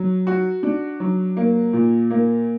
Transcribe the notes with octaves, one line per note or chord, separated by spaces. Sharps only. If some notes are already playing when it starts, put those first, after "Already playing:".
Already playing: F#3
F#4
D4
F#3
A#3
A#2
A#3